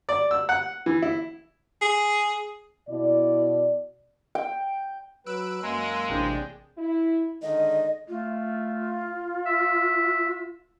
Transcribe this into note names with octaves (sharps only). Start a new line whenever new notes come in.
D5
E6
F#5
E3
E4
G#4
B2 E4 D5
G5
F#3 B4 E6 F#6 D7
F#2 G#3 A#3 G#5 A#5 C6
A1 C3 D4 G#4 G5
E4
D3 D#3 G#3 D#5
A3 F4
E5